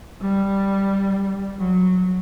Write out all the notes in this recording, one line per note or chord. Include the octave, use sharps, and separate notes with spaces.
G3
F#3